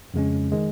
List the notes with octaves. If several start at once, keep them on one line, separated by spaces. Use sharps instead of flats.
F2 C#3 G#3 C#4
D#3 G#3